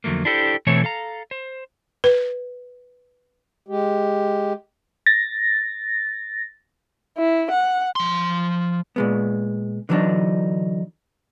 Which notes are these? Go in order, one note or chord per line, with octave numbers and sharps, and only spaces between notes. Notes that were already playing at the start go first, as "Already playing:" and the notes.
F2 D3 F#3 A3 A#3
D4 E4 G4 A4 B4 C5
B2 E3 A3 C4 E4 C#5
A4 F5 A#5
C5
B4
G#3 G4
A6 A#6
E4
F#5
F3 C6
A#2 G#3 B3
D3 E3 F#3 G3 D4 D#4